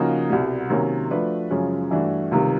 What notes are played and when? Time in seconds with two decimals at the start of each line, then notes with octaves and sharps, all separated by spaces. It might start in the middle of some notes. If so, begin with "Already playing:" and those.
Already playing: C#3 F3 A#3 D#4 F#4
0.30 C2 B2 G3
0.70 C3 D#3 F#3 A#3 C#4
1.11 F3 A3 D4 F#4 B4
1.51 F#2 C#3 F3 G#3 C#4
1.91 G2 E3 A3 D4 F#4
2.31 C#2 C3 D#3 G3